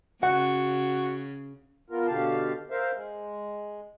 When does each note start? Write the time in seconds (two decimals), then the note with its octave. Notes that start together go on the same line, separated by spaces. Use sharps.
0.23 C#3 F#4 F#5
1.90 B3 F4 A#4
2.07 B2 D3 G4 F5 A5
2.71 A#4 C5 E5 F5
2.92 G#3